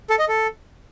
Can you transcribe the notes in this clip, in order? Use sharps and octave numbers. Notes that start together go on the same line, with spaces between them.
A4
D#5
A4